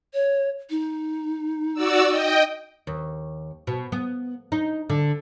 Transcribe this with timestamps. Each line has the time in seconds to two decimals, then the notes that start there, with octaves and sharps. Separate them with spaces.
0.14 C#5
0.70 D#4
1.74 F#4 D5 E6
2.08 D#5 G5
2.87 D#2
3.67 B2
3.92 B3
4.52 D#4
4.90 D3